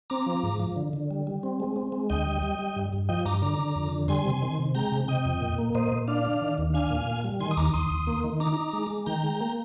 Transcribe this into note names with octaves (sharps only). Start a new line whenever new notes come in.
C4 A#5 D6
F3
G#2
F3
D3
D3
G3
G3
C4
G#3
C4
G#3
D2 D#5 G5
G3
G3
G3
G2
G2
F3 D#5 G5
G2 A#5 D6
D3 A#5 D6
D3
F2
D3
G3 G#5 C6
C3
D#3
C3
G#3 G5 A#5
C3
C3 D#5 G5
F2
A#2
A#3
A#2 C5 D#5
A#2
D4 D5 F5
D4
D#3
D#2
D4 F5 G#5
A#2
A#2
G3
D#3 G#5 C6
D#6
D#2 A#5 D6
D#2 C6 D#6
D#2
A#3
D#3
D#4 A#5 D6
D#4
G#3
G#3
D#3 G5 A#5
G#3
A#3